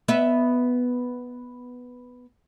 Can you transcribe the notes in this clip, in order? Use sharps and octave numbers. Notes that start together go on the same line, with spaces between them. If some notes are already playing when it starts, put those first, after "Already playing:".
B3 E5